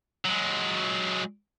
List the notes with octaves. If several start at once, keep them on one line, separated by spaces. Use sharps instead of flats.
F#3 G#3